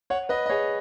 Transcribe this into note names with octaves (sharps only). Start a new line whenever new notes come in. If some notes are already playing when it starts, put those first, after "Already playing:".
C#5 F#5
B4 D#5
D#5
G#4 C#5